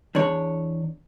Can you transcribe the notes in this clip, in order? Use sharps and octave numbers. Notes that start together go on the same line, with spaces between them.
E2 D4 C#5